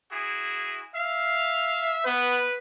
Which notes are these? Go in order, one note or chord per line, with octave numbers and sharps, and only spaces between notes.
E4 F#4 G#4
E5 F5
B3 B4